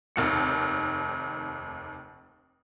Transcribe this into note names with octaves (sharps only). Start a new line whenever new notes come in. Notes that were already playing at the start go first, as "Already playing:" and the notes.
F1 D#2 C#7